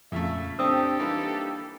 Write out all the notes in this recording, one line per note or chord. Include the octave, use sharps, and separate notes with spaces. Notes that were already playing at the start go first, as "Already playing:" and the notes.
F2 A#2 C#3 A3 E5
C4 D4 G4 A4 D#6 E6
E3 G3 A#3 D#4